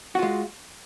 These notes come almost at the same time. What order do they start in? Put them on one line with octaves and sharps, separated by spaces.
F#4 F4 G#3